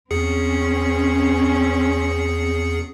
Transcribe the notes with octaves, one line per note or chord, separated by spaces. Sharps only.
E2 C4 C#4 G#4 C#7